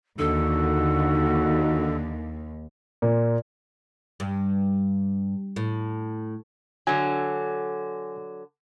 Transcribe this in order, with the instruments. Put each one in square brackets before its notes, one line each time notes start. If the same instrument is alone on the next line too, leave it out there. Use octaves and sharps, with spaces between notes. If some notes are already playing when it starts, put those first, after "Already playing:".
[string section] D#2 [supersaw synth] D3 [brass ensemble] D#4 F#4 [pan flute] A4
[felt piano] A#2
[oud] G2
A2
[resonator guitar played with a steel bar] D3 F#3 [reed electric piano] G#5